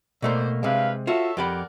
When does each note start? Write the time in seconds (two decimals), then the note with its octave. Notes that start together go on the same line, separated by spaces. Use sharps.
0.22 B2 A3 A#3 C5 D5
0.63 G2 C3 G#3 B4 F5
1.07 F4 F#4 A4 C#5 E5
1.37 F2 G4 A#4 D5 F#5 B5